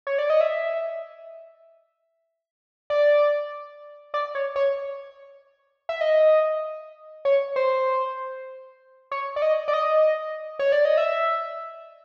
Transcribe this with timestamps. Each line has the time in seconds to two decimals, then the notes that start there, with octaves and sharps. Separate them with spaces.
0.07 C#5
0.18 D5
0.30 D#5
0.41 E5
2.90 D5
4.14 D5
4.35 C#5
4.56 C#5
5.89 E5
6.01 D#5
7.25 C#5
7.56 C5
9.12 C#5
9.36 D5
9.42 D#5
9.68 D5
9.73 D#5
10.59 C#5
10.72 D5
10.85 D#5
10.97 E5